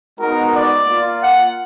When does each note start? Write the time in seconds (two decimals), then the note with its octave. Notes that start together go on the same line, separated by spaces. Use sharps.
0.18 G#3 B3 D#4 F#4 A#4
0.52 D5
0.86 A#3 F4
1.20 F#5